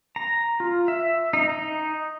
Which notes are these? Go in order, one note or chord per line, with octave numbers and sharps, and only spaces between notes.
A#5
F4
E5
D#4
D#4